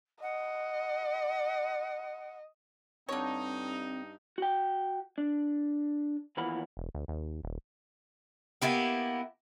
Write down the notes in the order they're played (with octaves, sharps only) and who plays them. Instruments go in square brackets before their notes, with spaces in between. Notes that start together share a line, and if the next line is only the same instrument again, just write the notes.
[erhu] D#5 [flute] F#5
[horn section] G2 D#4 [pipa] D3 C#5 [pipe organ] C4
[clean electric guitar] F#4 G5
D4
D#2 E3 F3 A#3 B3 B5
[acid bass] E1
D2
D#2
D#1
[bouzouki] A#3 B3 E4 G4